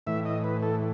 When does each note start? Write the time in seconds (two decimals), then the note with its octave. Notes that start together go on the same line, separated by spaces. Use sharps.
0.07 A2 E3 E5
0.25 D#5
0.44 B4
0.62 A4